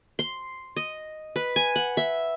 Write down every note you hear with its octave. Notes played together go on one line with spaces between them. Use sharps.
C6
D#5
B4
G#5
F#5
E5